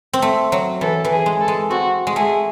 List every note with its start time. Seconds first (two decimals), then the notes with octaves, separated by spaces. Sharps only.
0.13 C4
0.22 A3
0.52 F#3
0.81 E3 A4
1.05 E3
1.12 G#4
1.26 G#3
1.41 A4
1.48 G#3
1.70 C4 F#4
2.07 G#3
2.16 A3 G#4